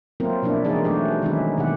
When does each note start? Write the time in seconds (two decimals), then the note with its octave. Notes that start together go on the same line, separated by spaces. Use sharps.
0.20 F#3 A#3 C4 E4 F4 A#4
0.42 B2 F3 A#3 D4 E4
0.64 E3 G#3 D#4 G#4 D5
0.84 F#3 A3 D4 F#4 G4
1.22 D#3 F#3 G#3 C#4 D#4 E4
1.57 B2 D#3 G4 F#5